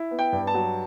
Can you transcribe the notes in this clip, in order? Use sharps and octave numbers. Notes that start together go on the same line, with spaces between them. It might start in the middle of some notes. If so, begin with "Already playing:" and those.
Already playing: E4
B3
G5
G2
A5
F#3